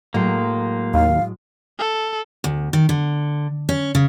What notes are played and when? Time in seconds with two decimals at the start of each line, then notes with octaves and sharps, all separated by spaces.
0.14 A2 F#3 G#3 A#3 C5
0.94 D#2 F5
1.79 A4
2.44 D2
2.73 D#3
2.89 D3
3.69 C#4
3.95 C#3